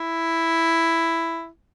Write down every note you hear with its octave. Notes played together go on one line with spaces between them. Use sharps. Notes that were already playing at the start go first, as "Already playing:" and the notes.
Already playing: E4